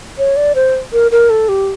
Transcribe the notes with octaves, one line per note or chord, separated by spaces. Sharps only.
C#5
D5
C5
A#4
A#4
A4
G4